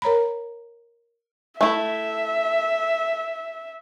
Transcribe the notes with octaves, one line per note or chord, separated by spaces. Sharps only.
A#4 C#5 A#5 B5
A3 E4 E5